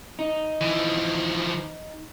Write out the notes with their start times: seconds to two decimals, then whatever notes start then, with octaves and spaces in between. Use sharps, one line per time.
0.19 D#4
0.61 E3 F3